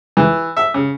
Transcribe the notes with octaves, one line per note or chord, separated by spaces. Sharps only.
E3
E5
C#3